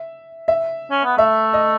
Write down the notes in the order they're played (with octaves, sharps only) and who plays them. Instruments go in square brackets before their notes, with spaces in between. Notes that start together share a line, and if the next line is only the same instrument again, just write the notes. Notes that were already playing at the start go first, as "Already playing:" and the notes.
Already playing: [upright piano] E5
E5
[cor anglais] C#4
B3
[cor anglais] A3 [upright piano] E5
[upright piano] D#5